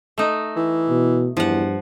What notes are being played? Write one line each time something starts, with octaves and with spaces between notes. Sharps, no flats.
A3 D#4
E3
B2
E2 G2 F3 F#5